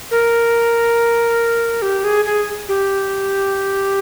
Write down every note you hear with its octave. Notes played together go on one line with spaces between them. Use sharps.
A#4
G4
G#4
G#4
G4